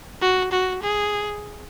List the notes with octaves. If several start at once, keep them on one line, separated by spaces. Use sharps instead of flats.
F#4
F#4
G#4